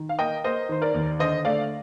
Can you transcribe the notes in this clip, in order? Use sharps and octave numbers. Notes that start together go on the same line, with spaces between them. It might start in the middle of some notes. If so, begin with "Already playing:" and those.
Already playing: D#3
F5
A#3 D#5 G5
A#3 C5 D#5
D#3 C5
A#4 D5
D#2
D3 C5 D#5
A3 D5 F5